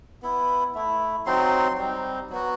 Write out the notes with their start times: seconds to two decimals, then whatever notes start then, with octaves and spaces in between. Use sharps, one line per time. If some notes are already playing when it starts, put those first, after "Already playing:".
0.22 B3 E4
0.75 A3 E4
1.26 F#3 C4 D#4 C6
1.78 G3 C4 D#4
2.30 F#3 B3 F#4